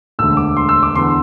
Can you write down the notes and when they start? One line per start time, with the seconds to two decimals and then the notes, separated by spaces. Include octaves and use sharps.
0.19 E1 D2 D3 E6
0.37 D6
0.56 C6
0.69 E6
0.83 D6
0.95 E2 D3 C6